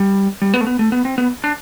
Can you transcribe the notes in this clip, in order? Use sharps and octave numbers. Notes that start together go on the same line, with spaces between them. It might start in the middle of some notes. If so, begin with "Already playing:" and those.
Already playing: G3
G3
B3
A3
B3
A3
B3
C4
B3
D4